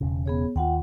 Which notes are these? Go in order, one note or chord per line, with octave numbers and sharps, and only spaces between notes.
E1 C#3
B3 G#4 C#5
D#2 F4 F#5 G5